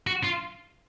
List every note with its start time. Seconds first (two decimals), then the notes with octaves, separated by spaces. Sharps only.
0.07 F#4
0.24 F4